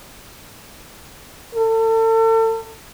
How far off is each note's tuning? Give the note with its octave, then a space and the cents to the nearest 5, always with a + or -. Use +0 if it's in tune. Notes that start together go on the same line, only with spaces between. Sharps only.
A4 +35